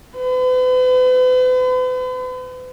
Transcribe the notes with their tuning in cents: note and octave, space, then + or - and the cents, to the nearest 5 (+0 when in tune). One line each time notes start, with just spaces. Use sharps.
B4 +45